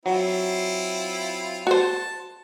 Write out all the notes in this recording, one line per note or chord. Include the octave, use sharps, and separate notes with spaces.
F#3 C4 E4 F4
F#4 C5 A5